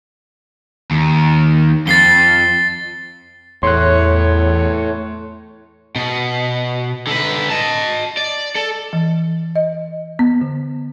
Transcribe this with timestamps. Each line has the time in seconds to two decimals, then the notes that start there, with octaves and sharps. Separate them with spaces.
0.91 D#2
1.87 F2 A6 C7 G7
3.63 E2 A2 C#5 C6 F#6
5.96 B2
7.07 D3 B4
7.50 D#5 A5
8.17 D5
8.55 A4
8.93 E3
9.56 D#5
10.19 B3
10.41 D3